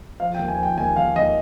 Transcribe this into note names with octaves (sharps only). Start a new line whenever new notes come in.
F3 F5
G5
D#2
G#5
F3
G5
D#2 G#5
D#2 F5
D#2 D#5